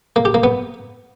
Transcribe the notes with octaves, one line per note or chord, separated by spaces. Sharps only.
A#3
G4
A#3
B3